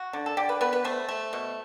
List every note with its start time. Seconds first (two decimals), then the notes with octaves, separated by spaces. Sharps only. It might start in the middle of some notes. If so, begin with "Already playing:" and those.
Already playing: F#4
0.13 D3
0.26 A4
0.37 D3 G4
0.49 B4
0.61 B3 B4
0.73 B4
0.84 A3 C5
1.09 A3
1.33 B2